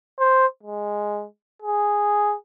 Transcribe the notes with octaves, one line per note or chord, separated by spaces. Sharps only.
C5
G#3
G#4